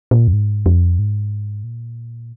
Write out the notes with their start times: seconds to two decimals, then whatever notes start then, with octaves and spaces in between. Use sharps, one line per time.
0.11 A#2
0.28 F2
0.33 G#2
0.66 F2
0.99 G#2
1.64 A#2